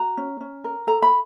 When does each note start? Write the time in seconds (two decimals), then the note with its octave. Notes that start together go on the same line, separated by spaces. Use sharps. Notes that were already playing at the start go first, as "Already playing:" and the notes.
Already playing: F#4 A#5
0.17 C#4
0.41 C#4
0.64 A#4
0.87 A4 A#5
1.02 B5